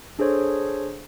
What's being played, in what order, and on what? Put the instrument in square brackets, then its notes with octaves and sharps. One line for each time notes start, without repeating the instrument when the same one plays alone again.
[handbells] D4 G#4 A4 C5 C#5